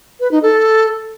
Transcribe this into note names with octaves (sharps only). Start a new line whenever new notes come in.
B4
D#4
A4